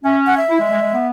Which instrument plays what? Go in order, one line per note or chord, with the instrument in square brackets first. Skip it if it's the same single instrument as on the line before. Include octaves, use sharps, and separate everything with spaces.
[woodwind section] C#4 [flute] E5
[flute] F#5
E5
[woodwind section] E4
G#3
G#3
G#3
B3